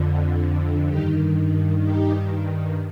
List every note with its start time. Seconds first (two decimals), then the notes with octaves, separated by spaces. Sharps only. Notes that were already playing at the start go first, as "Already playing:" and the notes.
Already playing: F2 D3
0.86 G2 D#3 D#4 G4
1.81 D#4 G4